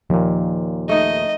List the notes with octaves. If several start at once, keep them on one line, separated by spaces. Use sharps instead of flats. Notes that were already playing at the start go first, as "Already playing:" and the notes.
D#2 A#2 F3
A3 D#4 D#5